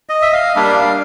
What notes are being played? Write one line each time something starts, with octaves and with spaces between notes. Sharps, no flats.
D#5
E5
F5
G3 A#3 D4 F5